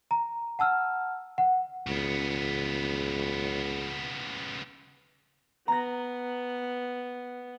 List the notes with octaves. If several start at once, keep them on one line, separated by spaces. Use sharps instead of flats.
A#5
F#5 A5 E6 F6
F#5
C#2 C#3 B3
B3 A#5 A#6